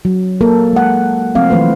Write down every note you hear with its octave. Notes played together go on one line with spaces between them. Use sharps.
F#3
A#3 A4 A#4
G#3 F#5
F3 A3 C4 F5
E3 F#3 A3 B4 C5